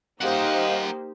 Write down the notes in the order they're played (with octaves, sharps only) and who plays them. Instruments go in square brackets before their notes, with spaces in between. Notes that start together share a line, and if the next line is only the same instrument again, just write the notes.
[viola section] A#3 D#4 C5 [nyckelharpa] G4 [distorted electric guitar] A#4 F#5 [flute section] D#5 F5